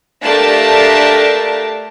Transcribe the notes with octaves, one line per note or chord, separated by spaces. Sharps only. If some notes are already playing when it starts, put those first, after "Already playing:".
A3 D4 G4 A#4 F5 A5